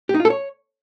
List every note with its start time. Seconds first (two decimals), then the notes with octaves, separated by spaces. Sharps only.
0.09 G4
0.14 D#4
0.20 F4
0.25 A4
0.30 C#5